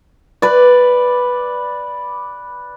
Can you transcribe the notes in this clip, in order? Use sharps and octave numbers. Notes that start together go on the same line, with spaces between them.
B4 D5